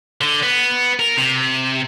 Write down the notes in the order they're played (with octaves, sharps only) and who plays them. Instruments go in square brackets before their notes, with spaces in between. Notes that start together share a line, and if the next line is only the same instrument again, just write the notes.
[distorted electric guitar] D3
B3
A#4
C3